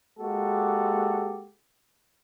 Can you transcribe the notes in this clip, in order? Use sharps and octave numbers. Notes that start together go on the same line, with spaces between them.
G#3 A#3 F#4 G4 A4